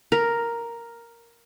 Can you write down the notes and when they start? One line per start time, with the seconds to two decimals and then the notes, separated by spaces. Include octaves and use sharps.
0.12 A#4